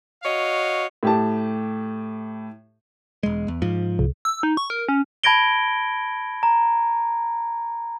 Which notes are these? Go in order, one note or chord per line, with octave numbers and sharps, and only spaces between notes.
F#4 C#5 D#5 F5
A2 G4 A5
E1 G#3
E2
G#2 F3
C2
E6
D#4
C#6
A#4
C#4
A5 B5 G#6 A#6 D7 G7
A#5